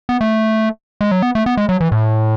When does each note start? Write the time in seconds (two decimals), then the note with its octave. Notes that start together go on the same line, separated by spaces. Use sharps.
0.09 B3
0.21 A3
1.01 G#3
1.11 F#3
1.22 B3
1.35 A3
1.46 B3
1.57 G#3
1.69 F#3
1.81 E3
1.92 A2